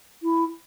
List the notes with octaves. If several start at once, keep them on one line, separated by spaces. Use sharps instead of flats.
E4